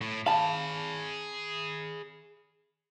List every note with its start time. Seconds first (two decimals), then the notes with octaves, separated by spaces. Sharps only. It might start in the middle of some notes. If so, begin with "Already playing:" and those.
0.01 A2
0.26 G#4 F5 A5 B5